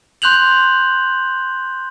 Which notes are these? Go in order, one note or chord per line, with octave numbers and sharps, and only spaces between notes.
C6 F#6 G6 F7 F#7